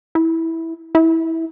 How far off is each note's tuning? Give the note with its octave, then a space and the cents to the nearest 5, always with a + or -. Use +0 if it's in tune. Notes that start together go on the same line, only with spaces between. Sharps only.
E4 -10
E4 -15